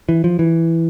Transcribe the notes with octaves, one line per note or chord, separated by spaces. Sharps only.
E3
F3
E3